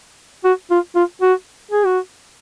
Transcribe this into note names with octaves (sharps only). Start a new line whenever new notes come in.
F#4
F4
F4
F#4
G#4
F#4